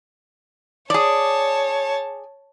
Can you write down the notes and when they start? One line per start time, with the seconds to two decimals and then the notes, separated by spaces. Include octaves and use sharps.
0.90 G#4 C#5 D5 A5